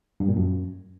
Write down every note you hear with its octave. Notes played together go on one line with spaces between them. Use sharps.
G2
A#2
F#2